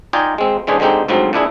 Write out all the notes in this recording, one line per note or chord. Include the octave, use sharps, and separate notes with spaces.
D#4 F4 D5 D#5 G5 G#5
G#3 C4
E3 G#3 C#4 D4 G#4 C5
D3 G#3 C4 D#4 G4
D2 G#2 F3 F#3 C4
A#2 D4 E4 G#4